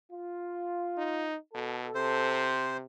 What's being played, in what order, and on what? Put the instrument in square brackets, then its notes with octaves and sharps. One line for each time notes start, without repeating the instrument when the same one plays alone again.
[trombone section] F4
[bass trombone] D#4
[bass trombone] B2 [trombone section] A4
[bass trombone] C3 [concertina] C5